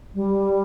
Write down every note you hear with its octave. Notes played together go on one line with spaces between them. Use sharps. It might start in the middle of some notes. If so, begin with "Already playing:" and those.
G3